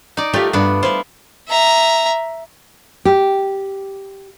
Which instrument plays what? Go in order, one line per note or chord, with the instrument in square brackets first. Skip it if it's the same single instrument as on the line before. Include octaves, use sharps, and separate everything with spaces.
[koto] D#4 D5
[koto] A3 A#4 [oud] F4 G4 D5
[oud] G2 [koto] B3 D4
[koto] E4 F4 [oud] C5
[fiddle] E5 A#5
[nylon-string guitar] G4